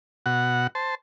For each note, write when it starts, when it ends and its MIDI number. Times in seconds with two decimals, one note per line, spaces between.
0.26 0.67 47
0.26 0.67 66
0.26 0.67 78
0.75 0.95 72
0.75 0.95 81